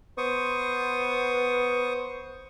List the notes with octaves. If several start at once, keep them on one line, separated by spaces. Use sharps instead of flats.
B3 C5 C#6 D#6